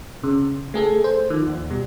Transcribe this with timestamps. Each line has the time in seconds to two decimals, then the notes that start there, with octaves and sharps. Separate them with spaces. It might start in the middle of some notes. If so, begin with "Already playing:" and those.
0.23 C#3
0.74 A3 G#4 A4
1.04 C5
1.30 D#3 F3
1.47 D#2
1.70 B2 G3